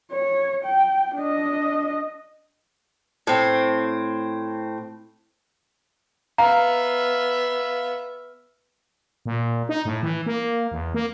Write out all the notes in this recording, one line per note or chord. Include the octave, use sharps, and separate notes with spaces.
C#5
G5
D4 D#5
A2 C4
B3 E5 F5 A#5
A#2
D#4
A2
E3
A#3
E2
A#3